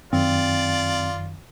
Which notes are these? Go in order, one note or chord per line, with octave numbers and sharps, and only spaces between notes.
F#2 D#3 C4 F4 D5